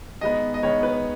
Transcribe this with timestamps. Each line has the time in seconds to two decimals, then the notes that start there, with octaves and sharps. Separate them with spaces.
0.21 D#3 G#3 B3 D#5
0.54 D#5
0.63 D#3 G#3 B3 C#5
0.83 B4